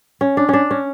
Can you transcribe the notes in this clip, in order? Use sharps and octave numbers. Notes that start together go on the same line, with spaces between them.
C#4
D4
C#4 D4
C#4